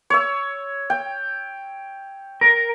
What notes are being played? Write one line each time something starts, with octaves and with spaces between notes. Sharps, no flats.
C#5 E6
G5
A#4